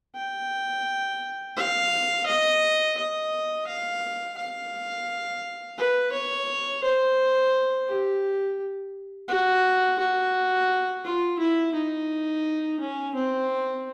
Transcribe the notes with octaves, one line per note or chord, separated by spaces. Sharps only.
G5
F5
D#5
D#5
F5
F5
B4
C#5
C5
G4
F#4
F#4
F4
E4
D#4
C#4
C4